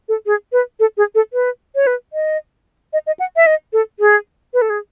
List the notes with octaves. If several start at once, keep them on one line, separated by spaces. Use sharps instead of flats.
A4
G#4
B4
A4
G#4
A4
B4
C#5
B4
D#5
D#5
D#5
F#5
E5
D#5
A4
G#4
B4
A4
G#4